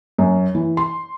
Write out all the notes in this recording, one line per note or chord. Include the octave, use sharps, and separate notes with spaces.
F#2
E3
C6